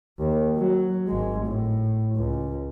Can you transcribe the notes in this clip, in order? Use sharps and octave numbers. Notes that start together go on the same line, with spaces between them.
D#2
F#3
G#1 G#3
A2
C#2